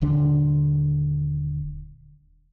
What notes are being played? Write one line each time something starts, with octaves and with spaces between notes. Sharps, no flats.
D#1 D3 D4